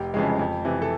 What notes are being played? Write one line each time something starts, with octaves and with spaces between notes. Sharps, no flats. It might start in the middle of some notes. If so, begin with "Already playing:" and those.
Already playing: F1 G4
F2 C#3 E3 G#3
F2
C3 E3
A4